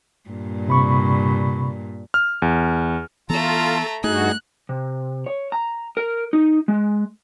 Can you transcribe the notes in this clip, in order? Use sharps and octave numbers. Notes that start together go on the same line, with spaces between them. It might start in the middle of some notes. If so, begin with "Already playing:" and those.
G2 A#2
C3 B5 C#6
F6
E2
E3 A3 B3 F4 A4 A#5
G2 A3 D#4 F#4 G#4 F#6
C3
C#5
A#5
A#4
D#4
G#3